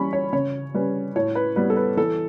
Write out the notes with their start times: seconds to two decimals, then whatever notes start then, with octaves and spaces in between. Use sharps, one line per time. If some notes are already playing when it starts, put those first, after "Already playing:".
Already playing: E3 G3 C#4 B5 C#6
0.13 C#5
0.33 C#3 C#5
0.74 G3 C#4 B4
1.16 A2 C#5
1.35 B4
1.56 G3 B3 B4
1.70 A4
1.77 B4
1.97 E3 A4